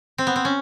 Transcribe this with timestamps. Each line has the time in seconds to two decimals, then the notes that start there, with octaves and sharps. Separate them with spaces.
0.18 C4
0.27 B3
0.36 C4
0.45 C#4